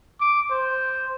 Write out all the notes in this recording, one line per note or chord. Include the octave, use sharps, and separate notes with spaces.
D6
C5